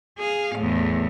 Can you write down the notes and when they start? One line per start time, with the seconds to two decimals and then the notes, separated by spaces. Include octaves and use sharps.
0.19 G#4 F5
0.55 E2 A2